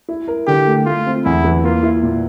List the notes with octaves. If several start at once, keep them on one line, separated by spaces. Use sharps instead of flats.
E4
A#4
D3 G4
A3
A3 F4
C4
E2 E4
E3
A#3 F4
E4
A#2